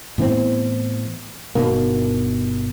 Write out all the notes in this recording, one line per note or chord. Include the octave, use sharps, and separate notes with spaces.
A2 E3 B3 C4
G1 B2 D#3 A#3